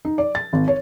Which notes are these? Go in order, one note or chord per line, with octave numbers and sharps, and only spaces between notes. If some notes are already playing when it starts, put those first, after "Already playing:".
D#4
D5
A6
G#1
C#5